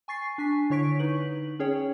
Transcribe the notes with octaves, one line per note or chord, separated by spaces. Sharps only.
G#5 C#6 A6 C7
D4 G#5 B6
D3 E4 C#5 C#6 B6 D7
D#4 B4 F#7
C#4 G#4 C#5 G5